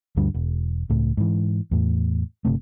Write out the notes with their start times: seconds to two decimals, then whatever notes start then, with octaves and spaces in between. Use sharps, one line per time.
0.16 D2 G2 D3 G3
0.34 E1
0.90 C#2 A2
1.17 G#2 E3
1.71 E2 A2
2.45 G1 C3 A3